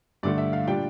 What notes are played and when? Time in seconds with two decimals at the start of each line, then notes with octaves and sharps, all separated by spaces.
0.23 G2 D3 A3 D5
0.38 E5
0.53 F5
0.67 A#2 G3 D4 F4 G5